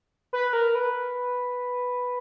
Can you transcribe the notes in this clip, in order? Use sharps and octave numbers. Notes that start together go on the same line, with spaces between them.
B4
A#4
B4